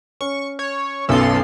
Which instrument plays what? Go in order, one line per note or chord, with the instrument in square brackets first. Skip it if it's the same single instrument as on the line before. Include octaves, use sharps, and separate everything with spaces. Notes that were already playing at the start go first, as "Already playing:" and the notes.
[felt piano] C#4 [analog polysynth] C#6
[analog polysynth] C#5
[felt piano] B1 F#2 [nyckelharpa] B3 F4 [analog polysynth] A4 C6